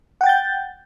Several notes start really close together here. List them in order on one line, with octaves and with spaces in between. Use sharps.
F#5 G5 A6 G6